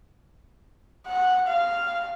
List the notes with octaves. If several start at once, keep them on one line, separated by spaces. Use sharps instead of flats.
F#5
F5